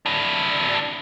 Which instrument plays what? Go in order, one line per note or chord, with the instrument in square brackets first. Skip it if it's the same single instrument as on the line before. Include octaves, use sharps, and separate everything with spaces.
[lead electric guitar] D4 E4